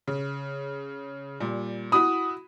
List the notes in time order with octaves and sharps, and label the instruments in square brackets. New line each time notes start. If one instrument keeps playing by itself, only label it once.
[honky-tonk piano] C#3
A#2 G3
[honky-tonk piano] E4 F#4 B5 [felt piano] D#6